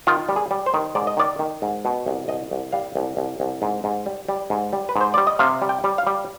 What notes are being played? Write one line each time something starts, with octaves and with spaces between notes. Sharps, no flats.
D#3 F4
G3
G#4
G3
C5
D#3
G#2 D5
D#5
D#3 D5
D#3
G#2
B2
C2
C2 D#5
C2
G3 F5
C2
C2
C2
G#2
G#2
G3
G3
G#2
G3
B4
G#2
C5
G3 D5
D#5
C3 F5
G3
G5
G3
F5
G3